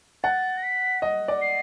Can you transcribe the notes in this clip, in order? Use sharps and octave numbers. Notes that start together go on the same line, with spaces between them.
F#5 A6
A#6
B6
D#5
D5
C7